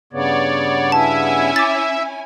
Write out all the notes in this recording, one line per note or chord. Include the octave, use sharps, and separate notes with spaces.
G2 C#3 B3 C#5 D5
C#4 E4 E5 G#5 A5
D6 A6